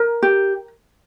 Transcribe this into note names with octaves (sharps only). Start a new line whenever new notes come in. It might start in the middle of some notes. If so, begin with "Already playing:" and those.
Already playing: A#4
G4